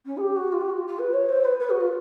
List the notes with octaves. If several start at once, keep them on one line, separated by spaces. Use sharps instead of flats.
C#4
G#4
G4
F#4
F4
G4
F#4
F4
F4
B4
C#5
C5
B4
B4
F#4
F4